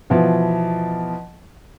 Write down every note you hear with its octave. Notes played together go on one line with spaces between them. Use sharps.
B2 E3 F3